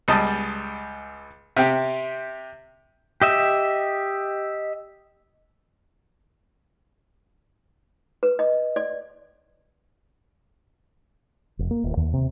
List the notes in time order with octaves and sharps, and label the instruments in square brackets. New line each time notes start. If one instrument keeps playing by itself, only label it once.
[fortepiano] C#2 G3 D#5 A5
C3 G4
[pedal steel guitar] G4 D#5 E5
[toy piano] B4
D#5
D5
[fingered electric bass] F1
A#3
D1
D#2
C3